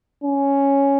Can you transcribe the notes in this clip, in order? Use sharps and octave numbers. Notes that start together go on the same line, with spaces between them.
C#4